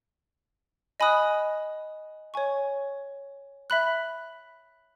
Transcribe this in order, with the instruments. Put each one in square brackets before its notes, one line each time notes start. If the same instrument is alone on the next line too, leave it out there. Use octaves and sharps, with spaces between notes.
[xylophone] D#5 G#5 B5 D#6 F#6
C#5 G#5 C#6
E5 B5 F#6